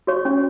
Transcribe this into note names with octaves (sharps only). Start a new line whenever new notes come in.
F#4 C#5 C#6
C#4